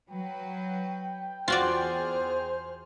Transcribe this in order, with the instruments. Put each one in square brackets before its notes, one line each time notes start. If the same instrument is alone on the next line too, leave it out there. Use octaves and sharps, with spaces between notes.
[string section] F#3 B4 [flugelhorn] G5
[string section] E2 G#4 F6 [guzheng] F4 F#4 D5 [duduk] C5